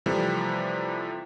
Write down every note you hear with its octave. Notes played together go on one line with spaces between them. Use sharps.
C3 E3 F3 G3 A3